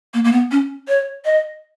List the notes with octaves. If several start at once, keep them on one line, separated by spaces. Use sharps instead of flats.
A#3
A#3
B3
C#4
C#5
D#5